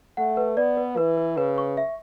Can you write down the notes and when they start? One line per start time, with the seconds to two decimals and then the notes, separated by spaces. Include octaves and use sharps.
0.17 A3 F#5
0.37 B4
0.57 B3 D5
0.77 B4
0.97 E3 B4
1.17 B4
1.37 C#3 B4
1.58 C#6
1.77 E5